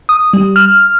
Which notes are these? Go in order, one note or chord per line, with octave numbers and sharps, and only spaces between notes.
D#6
G3
F6